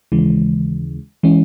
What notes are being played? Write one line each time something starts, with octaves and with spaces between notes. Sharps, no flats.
D#2 C#3 E3 G#3
E3 G#3 C#4